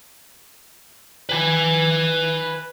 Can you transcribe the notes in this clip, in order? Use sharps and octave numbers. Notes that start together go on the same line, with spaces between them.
B4 G#5